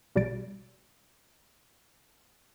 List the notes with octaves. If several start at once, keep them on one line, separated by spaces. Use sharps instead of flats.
A#1 B2 G3 D5 A6 D7